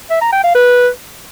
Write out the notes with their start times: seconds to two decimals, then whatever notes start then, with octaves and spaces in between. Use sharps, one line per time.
0.10 E5
0.21 A#5
0.32 G5
0.44 F5
0.55 B4